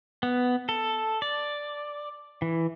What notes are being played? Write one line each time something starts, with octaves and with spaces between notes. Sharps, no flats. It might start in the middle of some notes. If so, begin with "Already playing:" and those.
B3
A4
D5
E3